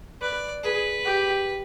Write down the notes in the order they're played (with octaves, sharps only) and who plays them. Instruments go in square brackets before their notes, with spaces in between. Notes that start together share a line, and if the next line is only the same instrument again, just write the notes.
[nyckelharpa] B4 [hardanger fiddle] D5
[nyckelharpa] G#4 [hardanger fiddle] B4
[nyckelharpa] G4